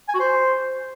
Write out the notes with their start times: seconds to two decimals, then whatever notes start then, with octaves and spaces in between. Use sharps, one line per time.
0.09 G#5
0.14 F#4
0.20 C5